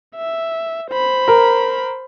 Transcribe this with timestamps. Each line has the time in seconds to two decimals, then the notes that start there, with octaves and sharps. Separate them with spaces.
0.16 E5
0.90 C5 B5
1.28 A#4